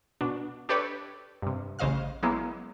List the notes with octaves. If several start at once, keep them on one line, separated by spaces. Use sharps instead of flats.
B2 D4
D4 G4 A4 B4 C#5 D5
G2 C3
A1 C#3 C5 D#5 F5 F6
F#3 G#3 A#3 B3 E4